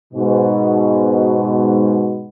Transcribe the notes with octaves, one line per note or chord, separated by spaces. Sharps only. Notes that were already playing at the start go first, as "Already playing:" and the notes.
G#2 B2